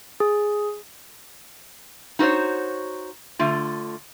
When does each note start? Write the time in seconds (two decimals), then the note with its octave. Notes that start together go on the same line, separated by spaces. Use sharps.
0.20 G#4
2.19 D#4 F#4 A#4 C5 C#5
3.39 D3 A3 F4